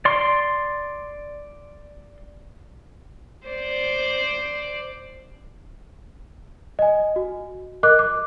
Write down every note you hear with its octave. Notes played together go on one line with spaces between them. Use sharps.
D5 C6
C5 D5
D#5 G#5
F#4
A#4 D#5 D6 F#6
D6